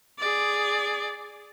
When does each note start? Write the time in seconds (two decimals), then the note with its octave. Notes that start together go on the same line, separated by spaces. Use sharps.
0.19 G#4 D5